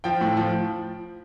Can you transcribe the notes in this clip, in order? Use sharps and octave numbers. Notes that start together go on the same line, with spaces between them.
F3 G5
A2
F3